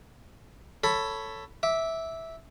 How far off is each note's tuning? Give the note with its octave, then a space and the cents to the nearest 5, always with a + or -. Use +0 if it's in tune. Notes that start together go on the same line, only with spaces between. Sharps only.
A4 +10 C#5 +0 B5 +0
E5 -10 D6 +0